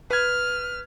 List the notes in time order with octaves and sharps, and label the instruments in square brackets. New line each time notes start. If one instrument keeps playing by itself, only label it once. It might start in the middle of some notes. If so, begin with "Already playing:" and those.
[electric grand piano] B4 G#6 [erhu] F6